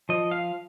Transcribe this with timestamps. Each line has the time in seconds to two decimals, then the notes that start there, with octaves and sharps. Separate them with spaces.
0.09 F3 D#5
0.31 F5